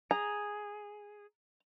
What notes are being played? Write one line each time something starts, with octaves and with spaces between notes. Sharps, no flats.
G#4 A#5